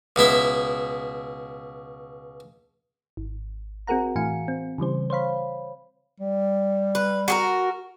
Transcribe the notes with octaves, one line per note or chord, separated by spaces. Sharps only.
C#2 B2 E4 E5
G#1
C4 F#4 G#4 A#4 F#5 A#5
A2 E3 F5 G#5 C#7
C4
C#3 E3 G3 C5
C5 C#5 F5 B5
G3
B4
F#4 G#4 A#4